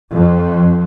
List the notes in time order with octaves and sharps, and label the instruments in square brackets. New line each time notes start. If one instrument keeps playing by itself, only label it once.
[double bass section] F2